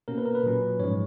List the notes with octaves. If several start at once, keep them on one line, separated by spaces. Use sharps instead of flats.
B2 A#3 C#4 A#4
B4
A#4
B4
A#2 F#3 C#4
G#2 F3 G#3 C#5